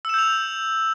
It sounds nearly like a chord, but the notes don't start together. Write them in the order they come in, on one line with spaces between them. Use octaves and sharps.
E6 E7 G6 F7